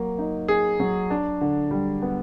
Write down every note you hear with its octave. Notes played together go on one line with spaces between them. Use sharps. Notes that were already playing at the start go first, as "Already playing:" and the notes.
Already playing: F#3 A#3
D#4
G#4
F#3
D4
D3
G3
B3